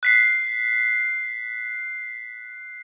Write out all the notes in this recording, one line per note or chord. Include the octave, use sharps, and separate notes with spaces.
F#6 B6 C7